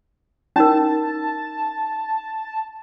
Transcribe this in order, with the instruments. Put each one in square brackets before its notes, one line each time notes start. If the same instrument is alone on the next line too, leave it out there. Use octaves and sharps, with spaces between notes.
[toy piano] C#4 D#4 A#4 [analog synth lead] A5